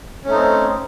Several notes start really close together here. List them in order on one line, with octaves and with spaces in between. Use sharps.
C#4 A3 D#4 C4